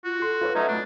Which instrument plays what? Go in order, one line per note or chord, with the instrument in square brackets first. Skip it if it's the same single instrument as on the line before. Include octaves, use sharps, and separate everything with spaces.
[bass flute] F4 [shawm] F#4
[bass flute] A4 [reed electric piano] C6
[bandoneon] G#2 [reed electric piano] F4 B4 C#5
[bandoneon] F#3 A3 D#4 [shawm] C#4
[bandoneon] B2 [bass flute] A3 [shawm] D4